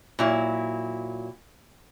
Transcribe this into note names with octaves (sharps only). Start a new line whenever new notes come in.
A#2 F#3 E4